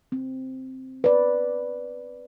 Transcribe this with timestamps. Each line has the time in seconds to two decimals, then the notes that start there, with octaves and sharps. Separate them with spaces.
0.12 C4
1.04 B4 D5